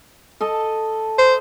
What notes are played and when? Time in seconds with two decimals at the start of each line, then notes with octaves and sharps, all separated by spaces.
0.41 A4 D#5 A5
1.18 C5